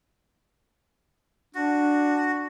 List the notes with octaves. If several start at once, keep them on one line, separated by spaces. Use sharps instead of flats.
D4 F#4